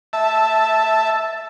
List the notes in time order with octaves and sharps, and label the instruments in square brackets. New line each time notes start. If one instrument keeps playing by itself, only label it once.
[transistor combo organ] E5 A5